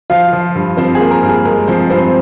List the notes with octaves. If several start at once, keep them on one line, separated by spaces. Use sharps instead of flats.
F3 F4 F5
F3
G2
F3 C4 C5
G#4
A#3
A#4
G2
G#4
G#3 A#4
F3 C4 C5
G2 C4 C5